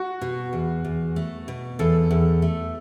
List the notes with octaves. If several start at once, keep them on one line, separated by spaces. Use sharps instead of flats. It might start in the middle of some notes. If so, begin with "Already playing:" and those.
Already playing: F#4
B2
E2
E2
A3
B2
E2 A4
E2
A3